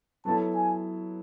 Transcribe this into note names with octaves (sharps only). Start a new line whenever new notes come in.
F#3 B3 E4 A4 A5
G#5